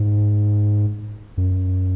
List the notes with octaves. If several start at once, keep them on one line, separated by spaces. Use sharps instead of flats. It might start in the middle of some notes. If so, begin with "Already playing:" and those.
Already playing: G#2
F#2